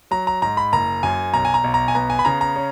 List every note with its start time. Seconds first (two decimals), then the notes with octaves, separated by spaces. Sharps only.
0.11 F#3 A#5
0.27 A#5
0.42 G#2 A#5
0.57 B5
0.72 F#1 A#5
1.03 F#2 G#5
1.33 B1 A#5
1.45 G#5
1.54 A#5
1.64 B1
1.74 A#5
1.88 G#5
1.95 B3 A#5
2.10 G#5
2.19 B5
2.25 C#3 A#5
2.41 A#5
2.56 C#4